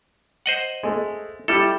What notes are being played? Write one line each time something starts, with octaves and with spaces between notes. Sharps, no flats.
C5 D#5 F#5
G#3 A3
G3 E4 G4 A4